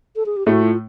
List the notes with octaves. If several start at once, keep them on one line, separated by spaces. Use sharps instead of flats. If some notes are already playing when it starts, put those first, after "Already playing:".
A4
G#4
G4
A2 A3 F#4
F4